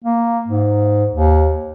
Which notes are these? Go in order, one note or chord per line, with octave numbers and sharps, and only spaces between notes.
A#3
G#2
D#2